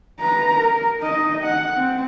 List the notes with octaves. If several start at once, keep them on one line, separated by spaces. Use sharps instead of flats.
B4 A#5
A#4
D#4 D#5
F#5
C4